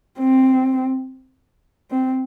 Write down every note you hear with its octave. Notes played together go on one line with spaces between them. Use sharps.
C4
C4